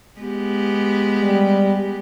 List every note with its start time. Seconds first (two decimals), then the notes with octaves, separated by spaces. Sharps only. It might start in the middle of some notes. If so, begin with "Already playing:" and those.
0.20 G#3 B3 G4
1.21 G3